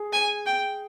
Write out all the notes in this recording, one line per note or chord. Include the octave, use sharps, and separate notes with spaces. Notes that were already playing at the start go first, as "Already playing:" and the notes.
Already playing: G#4
G#5
G5